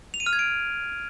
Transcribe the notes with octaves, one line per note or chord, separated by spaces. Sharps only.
F7
D#7
F6
G#6
D7